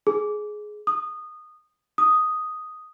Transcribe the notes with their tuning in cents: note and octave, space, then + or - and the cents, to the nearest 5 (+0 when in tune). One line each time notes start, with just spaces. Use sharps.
G#4 +15
D#6 -20
D#6 +0